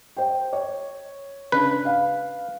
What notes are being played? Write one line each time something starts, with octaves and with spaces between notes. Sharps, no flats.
C5 G5
C#5
C#3 D4 B4
F5